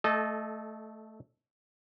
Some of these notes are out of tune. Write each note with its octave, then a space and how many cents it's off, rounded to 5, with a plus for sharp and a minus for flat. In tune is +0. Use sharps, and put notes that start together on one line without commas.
A3 +0 A4 -25 D#5 -15